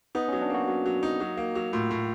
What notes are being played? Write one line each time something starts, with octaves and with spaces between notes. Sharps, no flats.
B3 D#4
F#3 C#4
D4
A#3 F#4
F#3
F#3
D#4
F#3
A#3
F#3
A2 F4
A2